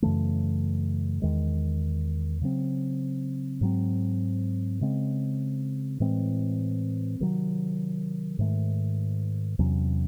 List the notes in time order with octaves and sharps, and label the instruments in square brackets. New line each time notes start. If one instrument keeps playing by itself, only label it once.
[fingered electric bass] F#2 C#3 E3 A3
E2 D#3 G#3
C#3 F#3 C4
G#2 F#3 C4
C#3 G#3 C4
A2 E3 G#3 C4
C3 D#3 F#3
G#2 D#3 A3
E2 C3 F#3 C#4